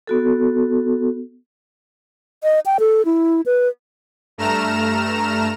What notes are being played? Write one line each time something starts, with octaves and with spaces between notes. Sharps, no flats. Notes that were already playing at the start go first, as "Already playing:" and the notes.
B3 F#4 A4
D#5
G5
A4
E4
B4
G2 A3 A#5 F6 E7